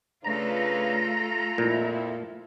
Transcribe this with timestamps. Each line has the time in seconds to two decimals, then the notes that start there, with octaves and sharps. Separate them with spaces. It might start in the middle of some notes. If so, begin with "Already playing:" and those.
0.24 C#3 A3 D4 F4 A4 B4 A#5
1.58 F2 A#2 E4